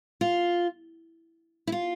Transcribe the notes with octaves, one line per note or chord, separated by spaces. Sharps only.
F4
E4
F4